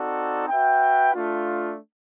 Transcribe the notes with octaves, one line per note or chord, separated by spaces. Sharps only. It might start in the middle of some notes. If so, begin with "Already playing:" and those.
Already playing: C4 D#4 F#4 A4 D5
F#4 B4 E5 G5
A3 D4 F4